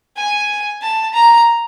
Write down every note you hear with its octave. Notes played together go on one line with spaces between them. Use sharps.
G#5
A5
A#5